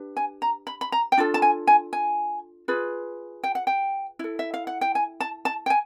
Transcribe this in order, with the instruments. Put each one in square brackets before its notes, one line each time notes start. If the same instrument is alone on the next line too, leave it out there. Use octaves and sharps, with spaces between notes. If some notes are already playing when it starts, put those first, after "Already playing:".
Already playing: [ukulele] D4 G4 B4
G#5
A#5
B5
B5
A#5
G5
D4 F4 A4
A5
G#5
G#5
G#5
F4 G#4 B4
G5
F#5
G5
E4 A4
E5
F5
F#5
G5
G#5
A5
A5
G5
G#5